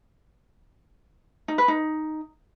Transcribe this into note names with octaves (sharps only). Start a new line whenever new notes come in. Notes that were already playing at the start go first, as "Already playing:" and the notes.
D#4
B4
D#4